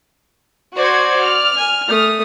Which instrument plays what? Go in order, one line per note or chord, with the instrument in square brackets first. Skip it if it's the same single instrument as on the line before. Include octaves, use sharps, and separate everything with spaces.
[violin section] F#4 C5 G#6 [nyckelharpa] D5
[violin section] F6
[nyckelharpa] G#5
A3 D#6